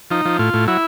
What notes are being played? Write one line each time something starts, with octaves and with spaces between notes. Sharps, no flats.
F3 D#4
F3
A2 F4
A2
F#3 E4